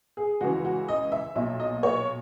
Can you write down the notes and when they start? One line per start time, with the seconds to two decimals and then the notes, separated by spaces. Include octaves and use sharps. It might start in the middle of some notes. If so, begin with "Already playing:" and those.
0.17 G#4
0.41 C#2 C#3 E3 F#4
0.65 F#4
0.88 D#5
1.12 E5
1.35 B1 A#2 E5
1.60 D#5
1.83 C#5